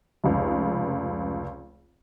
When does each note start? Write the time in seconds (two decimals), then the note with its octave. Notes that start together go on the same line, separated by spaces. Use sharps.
0.24 F1 C#2